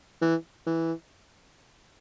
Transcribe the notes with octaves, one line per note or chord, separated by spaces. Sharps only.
E3
E3